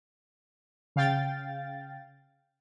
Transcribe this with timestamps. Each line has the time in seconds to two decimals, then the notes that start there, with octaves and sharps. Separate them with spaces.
0.96 C#3 F5 G5 A6